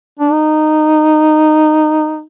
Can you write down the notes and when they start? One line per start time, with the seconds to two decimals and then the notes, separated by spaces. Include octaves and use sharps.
0.19 D4
0.32 D#4